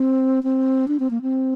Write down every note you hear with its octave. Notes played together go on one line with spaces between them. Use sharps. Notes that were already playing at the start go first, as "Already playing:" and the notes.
Already playing: C4
C4
D4
C4
A#3
C4